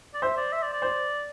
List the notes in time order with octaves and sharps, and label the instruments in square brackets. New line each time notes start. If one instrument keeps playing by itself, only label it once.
[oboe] D5
[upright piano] C5 [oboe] E5
[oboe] D5
E5
D5
D5
[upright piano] C5